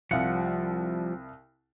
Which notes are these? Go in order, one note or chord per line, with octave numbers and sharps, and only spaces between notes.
C2 F3 G3 F5 F#5 C#7